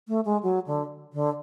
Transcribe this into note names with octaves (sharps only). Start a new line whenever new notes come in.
A3
G#3
F#3
D3
D3